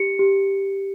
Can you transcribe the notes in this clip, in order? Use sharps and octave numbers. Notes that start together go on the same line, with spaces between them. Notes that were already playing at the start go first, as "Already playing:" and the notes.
Already playing: G4 C#7
G4